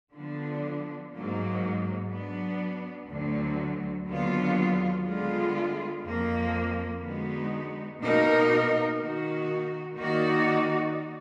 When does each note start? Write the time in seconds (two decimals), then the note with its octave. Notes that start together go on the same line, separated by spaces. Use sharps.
0.15 D3 F3 B3 D4
1.13 G#2 F#3 A#3
2.12 F#3 B3 D4
3.10 D2 D3 F#3
4.08 D#2 D3 F#3 B3 F4
5.06 D3 G#3 B3 F4 G#4
6.04 F2 F3 A#3
7.03 D3 G#3 B3 D#4 F#4
8.00 B2 A#3 D#4 A#4
8.99 D#3 A#3 D#4 F#4
9.97 D#3 A#3 D#4 F#4 D5